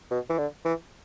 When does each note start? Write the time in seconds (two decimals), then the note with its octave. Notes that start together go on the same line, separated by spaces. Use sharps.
0.11 B2
0.30 E3
0.38 D3
0.65 E3